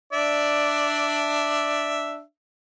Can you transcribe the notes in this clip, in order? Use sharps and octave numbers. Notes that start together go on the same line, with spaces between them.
D4 D5 E5